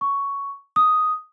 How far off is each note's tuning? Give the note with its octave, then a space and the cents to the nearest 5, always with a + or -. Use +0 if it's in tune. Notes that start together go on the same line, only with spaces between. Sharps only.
C#6 +10
D#6 +0